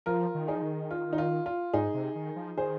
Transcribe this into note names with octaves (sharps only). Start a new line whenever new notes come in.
F3 F4 A#4
D#3
D#4 G#4
F3
D#3
F4
D#4
F4
F4
G#2 D#4 G#4
C3
D#3
F3
D#3 G#4 C5